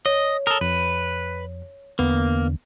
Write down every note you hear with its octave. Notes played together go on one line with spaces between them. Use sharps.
C#5 D#5
A4 A#4 D#6
F2 B4
E2 D3 A#3 B3